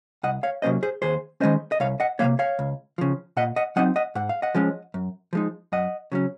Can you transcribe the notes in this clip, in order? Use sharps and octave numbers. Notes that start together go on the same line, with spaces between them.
C2 D#5 F#5
C#5 F5
C3 F#3 A#3 C#4 C5 D#5
G#4 C5
D#2 G#4 C5
D#3 G#3 C#4 C5 D#5
D#5
C2 C#5 F5
D#5 F#5
C3 F3 A#3 C#5 F5
C#5 F5
C#2
C#3 F3
A#2 D#5 F#5
D#5 F#5
F#3 C4 D#4 D#5 F#5
D#5 F#5
G#2 F#5
F5
D#5 F#5
F3 G#3 C#4
F#2
F3 G#3 D#4
F#2 D#5 F#5
C#3 F#3 C#4